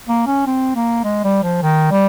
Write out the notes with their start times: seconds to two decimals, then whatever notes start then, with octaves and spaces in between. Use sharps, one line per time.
0.08 A#3
0.27 C#4
0.46 C4
0.75 A#3
1.04 G#3
1.24 G3
1.43 F3
1.62 D#3
1.91 G3